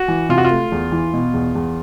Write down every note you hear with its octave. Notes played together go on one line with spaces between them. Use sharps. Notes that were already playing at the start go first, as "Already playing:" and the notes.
Already playing: F#4
E3
C3 F4
F#4
F4
A3
E2
E3
B2
E2
E2